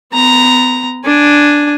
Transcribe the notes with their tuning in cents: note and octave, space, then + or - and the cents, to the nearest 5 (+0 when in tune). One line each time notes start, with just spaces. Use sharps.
B3 +40 A#5 +0
D4 +0 G#5 +0